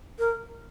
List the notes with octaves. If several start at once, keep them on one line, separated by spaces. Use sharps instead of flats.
A#4